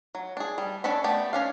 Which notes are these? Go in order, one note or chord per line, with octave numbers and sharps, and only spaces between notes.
F#3
D4 G#4
G3
C#4 D4 A4 C#5 B5
A3 B3 G4 D5
C#4 D4 F5